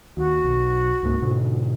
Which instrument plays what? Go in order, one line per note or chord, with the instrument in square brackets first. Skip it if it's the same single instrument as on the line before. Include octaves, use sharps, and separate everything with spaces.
[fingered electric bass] D#2 [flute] F#4
[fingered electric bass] B1
C#2 G#2 A#3
G#2 B2 D3